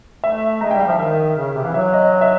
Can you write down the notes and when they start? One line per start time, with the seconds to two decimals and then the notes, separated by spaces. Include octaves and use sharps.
0.24 A3 E5
0.61 G#3 A#5
0.71 G5
0.74 G3
0.80 F5
0.86 F3 E5
0.99 D#3 E5
1.37 C#3
1.55 C3
1.64 E3 F5
1.74 F#3 E5
1.93 D#5
2.12 D#5
2.21 E5